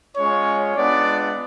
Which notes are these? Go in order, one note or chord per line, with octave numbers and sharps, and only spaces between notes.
G#3 C#4 F4 C#5
G#3 B3 D4 F4 D5